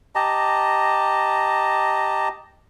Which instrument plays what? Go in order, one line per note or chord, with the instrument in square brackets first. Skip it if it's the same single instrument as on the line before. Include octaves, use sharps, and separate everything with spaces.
[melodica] G4 D#5 A5 A#5